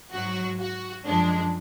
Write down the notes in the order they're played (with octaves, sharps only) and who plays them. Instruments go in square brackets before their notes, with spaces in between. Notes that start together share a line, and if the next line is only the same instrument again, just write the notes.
[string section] G#2 F#3 F#4
F#4
F#2 F3 G#3 D4